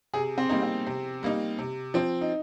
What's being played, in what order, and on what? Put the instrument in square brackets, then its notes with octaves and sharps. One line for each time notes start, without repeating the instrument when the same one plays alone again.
[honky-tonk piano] C3 [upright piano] G#4
[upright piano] C4
[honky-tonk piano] G3 A#3 D#4
[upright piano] C4
[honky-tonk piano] C3
G3 A#3 D#4
C3
F3 C4
[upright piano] D#4